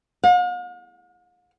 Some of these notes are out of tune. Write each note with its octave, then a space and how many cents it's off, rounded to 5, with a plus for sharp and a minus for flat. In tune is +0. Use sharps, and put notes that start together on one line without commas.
F5 +45